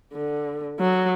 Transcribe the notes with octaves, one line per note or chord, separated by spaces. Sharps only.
D3
F#3